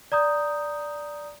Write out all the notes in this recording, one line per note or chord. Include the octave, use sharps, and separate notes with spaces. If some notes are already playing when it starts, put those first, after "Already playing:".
D5 A#5 D#6 G6